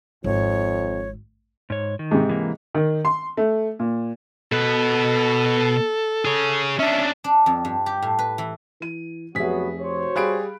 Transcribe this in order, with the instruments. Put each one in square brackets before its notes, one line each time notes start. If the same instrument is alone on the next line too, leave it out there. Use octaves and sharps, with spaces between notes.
[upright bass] G#1 [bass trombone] F2 [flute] C#5
[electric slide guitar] G#2 C#5
D#3
[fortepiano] G#2 C3
[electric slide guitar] E3 A#3
[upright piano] D#3
C6
A3
A#2
[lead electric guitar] B2 B4 [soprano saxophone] A4
[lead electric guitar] G#4 C#5
[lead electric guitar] C#4 D4 [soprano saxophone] E5
[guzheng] D4
F2
G2
G4
A2
B4
E3
[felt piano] E3 D#7
[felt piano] F1 E5 [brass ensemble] F#3 B3 F#4 [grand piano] G#4 B6
[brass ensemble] F#4 C5 C#5
[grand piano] G3 G#4 D7 [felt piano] F5 B5 F#6